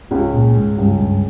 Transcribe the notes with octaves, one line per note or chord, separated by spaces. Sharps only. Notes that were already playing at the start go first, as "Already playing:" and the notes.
C#2 C#3 G#3 C#4 G#4
A#2
G#2
C#2 G2 C#3 G#3 C#4 G#4
G2